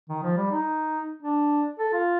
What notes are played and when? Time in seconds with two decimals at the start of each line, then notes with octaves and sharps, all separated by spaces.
0.09 D#3
0.23 F3
0.37 G3
0.51 D#4
1.22 D4
1.79 A4
1.93 F4